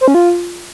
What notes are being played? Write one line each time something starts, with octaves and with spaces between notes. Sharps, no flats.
C5
C#4
F4